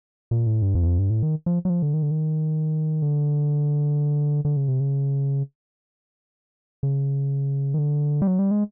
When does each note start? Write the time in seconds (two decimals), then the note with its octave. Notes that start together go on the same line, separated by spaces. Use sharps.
0.31 A#2
0.47 A2
0.62 G2
0.75 F2
0.82 E2
0.86 F2
0.98 G2
1.10 A2
1.23 D#3
1.46 F3
1.65 F#3
1.70 F3
1.82 D3
1.94 D#3
2.02 D3
2.11 D#3
3.02 D3
4.45 D3
4.57 C#3
4.68 C3
4.80 C#3
6.83 C#3
7.74 D#3
7.78 D3
8.22 G3
8.27 F#3
8.39 G3
8.51 G#3